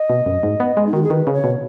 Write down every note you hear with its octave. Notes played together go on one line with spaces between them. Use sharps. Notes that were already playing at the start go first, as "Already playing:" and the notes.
Already playing: D#5
B2
F#2
G#2
B3
G#3
D#4
D#3 F#4
G#4
D#3 B4
C#3
C#5
B2